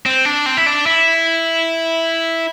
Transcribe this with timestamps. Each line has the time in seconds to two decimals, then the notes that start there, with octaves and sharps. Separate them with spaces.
0.06 C4
0.25 D4
0.46 C4
0.57 E4
0.66 D4
0.86 E4